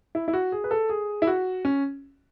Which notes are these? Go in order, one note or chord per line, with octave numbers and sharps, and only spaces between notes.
E4
E4
F#4
G#4
B4
A4
G#4
E4
F#4
C#4